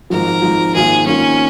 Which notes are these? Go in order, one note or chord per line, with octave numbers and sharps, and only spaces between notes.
G#1 G#2 F3 A#4
G#1 G#2 F3
G#1 G#2 D#3 A#3 F4 G#4
G#1 G#2 D#3 A#3 C#4 F4